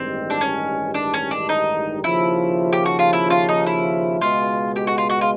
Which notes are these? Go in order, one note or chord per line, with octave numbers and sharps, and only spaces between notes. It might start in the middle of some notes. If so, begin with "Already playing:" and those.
Already playing: A1 G2 D#3 G#3 C4
D4
C#4
D4
C#4
D4
D#4
D#2 C#3 F3 E4
G4
F#4
F4
E4
F4
D#4
E4
C#2 B2 G#3 F4
G4
F#4
F4
F#4
F4